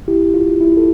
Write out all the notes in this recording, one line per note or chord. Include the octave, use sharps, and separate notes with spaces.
E4 G4
F4
E4
A4